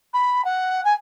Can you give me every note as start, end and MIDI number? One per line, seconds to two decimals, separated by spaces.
0.14 0.45 83
0.45 0.83 78
0.85 0.93 80